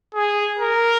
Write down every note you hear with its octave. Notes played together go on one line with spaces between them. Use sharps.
G#4
A#4